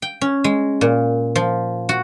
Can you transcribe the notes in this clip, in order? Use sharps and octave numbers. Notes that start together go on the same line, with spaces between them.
G5
C#4
G#3
A#2
F3
F#4